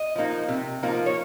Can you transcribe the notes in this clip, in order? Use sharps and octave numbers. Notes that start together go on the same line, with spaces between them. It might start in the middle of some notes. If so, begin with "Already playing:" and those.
Already playing: D#5
F3 A#3 D#4
C3
F3 A#3 D#4
C#5